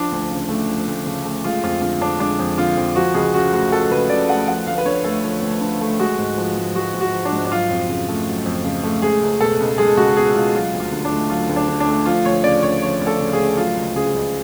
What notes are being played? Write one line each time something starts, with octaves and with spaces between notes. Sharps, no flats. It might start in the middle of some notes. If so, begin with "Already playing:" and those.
Already playing: F3 D4
D2
C#3
A3
F3
D2
C#3
A3
G#3 F4
F2 F4
D3 F4
F2 D4
G#3 D4
F2
D3 F4
F2
F3 F#4
C#2 G#4
C#3 F#4
A3 F#4
F3 A4
C#2 B4
C#3 D5
A3 F#5
F3 F#5
D2 F5
B4
D3 C#5
A3 A4
F3
D2
D3
A3
G#3 F#4
G#2
F3
G#2
G#3 F#4
G#2
F#4
F3
D4
G#2
D4
F#3 F4
F2
C#3
A3
F#3
F2
C#3
A3
G#3 G#4
C#2
B2 A4
C#2
G#3 G#4
C#2 F#4
B2 G#4
C#2 F4
F#3 F4
D2
F4
D3
D4
A3
F#3 F4
D2
D4
D3
D4
A3
F3 F4
D2 C#5
C#3 D5
D2 C#5
F3 C#5
D2
A4
C#3
G#4
D2
F#3 F4
C#2
C#3 G#4
C#2